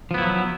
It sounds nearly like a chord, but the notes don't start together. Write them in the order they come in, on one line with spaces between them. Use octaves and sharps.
F3 B3 E4 F#3